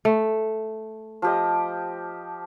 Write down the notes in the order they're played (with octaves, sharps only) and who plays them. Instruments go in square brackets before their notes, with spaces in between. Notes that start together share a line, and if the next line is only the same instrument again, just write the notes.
[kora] A3
[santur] F3 G4 D#5